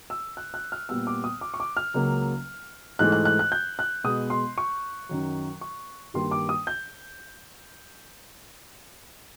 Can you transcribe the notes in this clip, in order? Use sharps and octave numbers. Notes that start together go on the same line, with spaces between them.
E6
F#6
F#6
F6
A#2 G3 B3 E6
D6
D#6
D6
C#6
D6
F6
C#2 C#3 F#3 A#3
G#2 E3 A3 F#6
F#6
F#6
F#6
G6
F#6
B2 G#3 B3 D#6
C6
C#6
F#2 D#3 F#3
C#6
G2 D#3 G3 A#3 C6
D6
D#6
G6